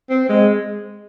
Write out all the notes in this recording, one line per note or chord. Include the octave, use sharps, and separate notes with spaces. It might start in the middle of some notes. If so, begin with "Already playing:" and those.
C4
G#3